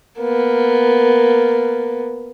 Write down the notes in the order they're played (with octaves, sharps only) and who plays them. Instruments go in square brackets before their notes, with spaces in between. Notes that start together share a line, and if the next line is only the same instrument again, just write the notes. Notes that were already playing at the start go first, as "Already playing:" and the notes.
[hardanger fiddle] A#3 B3